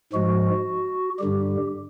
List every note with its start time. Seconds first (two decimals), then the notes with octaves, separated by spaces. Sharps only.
0.13 G#2 F3 G#3 F#4
1.19 G2 D3 G3 G4